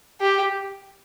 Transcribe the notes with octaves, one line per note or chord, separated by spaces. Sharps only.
G4